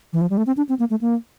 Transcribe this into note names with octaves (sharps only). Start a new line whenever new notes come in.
E3
F3
G3
A3
C4
D4
C4
A#3
A3
A#3